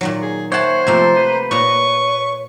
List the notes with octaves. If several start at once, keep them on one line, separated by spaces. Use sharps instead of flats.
A#2 D#3 F#3
G#4
C5 C#5 E5 F#5 G5 A5
C3 F3 A3 A#3 A#5
B4
A#2 C#5 D#5 A#5 C#6